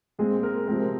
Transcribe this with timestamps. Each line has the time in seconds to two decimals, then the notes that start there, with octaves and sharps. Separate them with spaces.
0.19 A#2 G#3 C4 G#4
0.43 A#4
0.68 C3 F3 G#3 C4 A#4